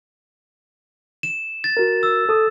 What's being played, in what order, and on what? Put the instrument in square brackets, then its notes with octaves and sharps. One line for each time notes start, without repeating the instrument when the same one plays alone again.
[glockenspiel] E7
A6
[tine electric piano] F#4 A#4
[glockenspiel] E6
[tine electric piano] A4 D#6